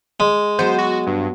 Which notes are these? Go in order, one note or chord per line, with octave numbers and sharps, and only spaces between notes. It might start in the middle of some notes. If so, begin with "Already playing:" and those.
G#3
F#3 B3 C5
F#4
G2